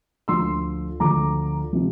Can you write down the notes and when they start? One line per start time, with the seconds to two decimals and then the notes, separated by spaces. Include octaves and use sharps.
0.28 D2 D3 F3 C6 E6
1.00 D2 D3 F3 A#5 D6
1.73 C3 F3